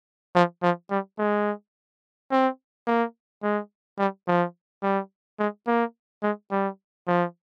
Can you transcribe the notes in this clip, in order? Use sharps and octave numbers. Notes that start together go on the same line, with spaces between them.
F3
F3
G3
G#3
C4
A#3
G#3
G3
F3
G3
G#3
A#3
G#3
G3
F3